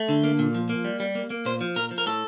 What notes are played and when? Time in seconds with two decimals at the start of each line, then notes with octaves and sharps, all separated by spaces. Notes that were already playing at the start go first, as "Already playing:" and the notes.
Already playing: A3
0.09 D3
0.24 A#3
0.39 A#2
0.54 F3
0.69 A#3
0.84 G3
1.00 G3
1.15 A#3
1.30 A#3
1.45 A#2 C5
1.61 F3
1.76 A#2 A#4
1.91 F3
1.98 A#4
2.06 A2 A4